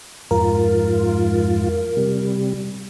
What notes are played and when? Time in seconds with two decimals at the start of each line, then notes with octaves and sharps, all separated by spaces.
0.31 F2 G#2 F4 A#4
1.97 C3 G3